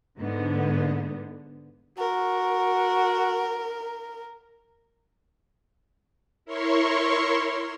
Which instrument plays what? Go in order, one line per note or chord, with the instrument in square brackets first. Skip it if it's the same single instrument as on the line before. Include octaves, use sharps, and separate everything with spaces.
[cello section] G#2 D3 B3
[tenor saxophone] F#4 [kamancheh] A#4
[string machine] E4 A#4 C#5 C6 C#6